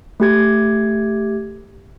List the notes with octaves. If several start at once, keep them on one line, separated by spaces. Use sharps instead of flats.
A3 G4 G#6